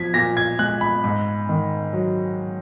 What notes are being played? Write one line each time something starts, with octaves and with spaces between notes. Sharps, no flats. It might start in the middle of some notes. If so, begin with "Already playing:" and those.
Already playing: F3 G#6 B6
A#2 A#6
G#6
G#3 F#6
B5
G#2
D#3
F#3